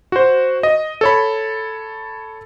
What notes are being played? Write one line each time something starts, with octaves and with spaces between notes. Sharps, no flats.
F#4 C5
D#5
A4 C#5 B5